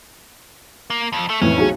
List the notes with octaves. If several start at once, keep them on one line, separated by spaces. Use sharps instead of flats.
A#3
F2
A3
F2 A2 E3 C#4
B1 F#4 G#4